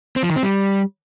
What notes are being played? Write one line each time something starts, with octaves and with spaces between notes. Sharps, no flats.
C4
F3
D#3
C4
G3